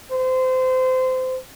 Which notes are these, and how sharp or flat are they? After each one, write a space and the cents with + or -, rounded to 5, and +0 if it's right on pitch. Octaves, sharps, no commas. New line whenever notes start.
C5 -25